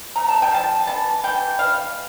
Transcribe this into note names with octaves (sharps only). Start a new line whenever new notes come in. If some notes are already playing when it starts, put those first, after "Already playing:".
A3 A#5
A5
G5
F3 A5
E3 A5
E3 G5
E3 F5